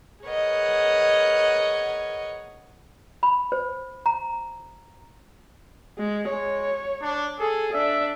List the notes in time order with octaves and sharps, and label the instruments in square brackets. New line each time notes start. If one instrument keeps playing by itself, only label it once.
[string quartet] G#4 A#4 B4 C#5 D#5 F#5
[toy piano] B5
C5
A#5
[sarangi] G#3
[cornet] G#3 [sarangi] C#5
[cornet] D4
[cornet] G#4 [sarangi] A4
[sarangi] D4 [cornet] E5